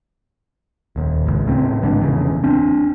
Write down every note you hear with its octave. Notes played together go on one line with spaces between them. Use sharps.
D#1 D#2
G#1 C#2
A2 C#3 C4
A1 G#2 D3
F1 E2 C#3
C4 D4